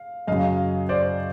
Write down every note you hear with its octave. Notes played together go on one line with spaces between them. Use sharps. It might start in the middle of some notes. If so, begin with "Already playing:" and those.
Already playing: F5
F#2 C#3 F#3 D#5 F5
C5 D5